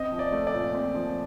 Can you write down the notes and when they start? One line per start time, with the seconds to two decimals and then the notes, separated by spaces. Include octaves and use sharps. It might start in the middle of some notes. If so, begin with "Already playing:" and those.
Already playing: C4 D#5
0.12 F3
0.19 D5
0.32 A3
0.47 D5
0.53 A#2
0.74 C4
0.94 F3